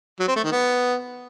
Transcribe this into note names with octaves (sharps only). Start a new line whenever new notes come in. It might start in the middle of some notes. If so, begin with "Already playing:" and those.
F#3
C4
A3
D#3
B3